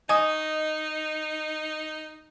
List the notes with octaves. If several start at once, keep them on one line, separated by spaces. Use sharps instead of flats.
D#4 D#5 G#5 C#6 D#6